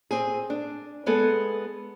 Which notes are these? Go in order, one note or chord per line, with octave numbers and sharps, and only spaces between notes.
C4 G#4
D4
G#3 B3 G#4 A4